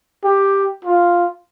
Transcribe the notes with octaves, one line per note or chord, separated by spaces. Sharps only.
G4
F4